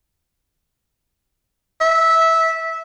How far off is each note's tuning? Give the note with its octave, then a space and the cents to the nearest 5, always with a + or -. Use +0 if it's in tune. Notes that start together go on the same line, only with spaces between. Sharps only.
E5 -15